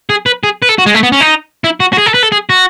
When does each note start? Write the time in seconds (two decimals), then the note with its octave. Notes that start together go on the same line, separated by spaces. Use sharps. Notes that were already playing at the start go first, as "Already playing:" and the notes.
0.10 G#4
0.26 B4
0.43 G#4
0.62 B4
0.69 A4
0.78 F#4
0.86 G#3
0.94 A3
1.03 B3
1.12 C#4
1.21 D#4
1.64 E4
1.80 F#4
1.93 F#4
1.98 G#4
2.06 A4
2.14 B4
2.23 A4
2.32 G#4
2.50 F#4